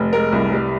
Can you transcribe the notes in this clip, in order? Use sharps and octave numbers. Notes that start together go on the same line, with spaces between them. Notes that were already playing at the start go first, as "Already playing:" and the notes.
Already playing: F1
G#3 A#4
C2
G3